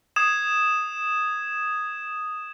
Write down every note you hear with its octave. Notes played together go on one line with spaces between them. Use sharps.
D#6 G#6 E7